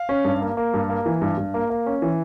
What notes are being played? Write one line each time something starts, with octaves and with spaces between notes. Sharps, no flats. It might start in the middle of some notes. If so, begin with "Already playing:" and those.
Already playing: F5
C#4
G2
A#3
A#3
G2
A#3
E3
G2
G2
A#3
A#3
C#4
E3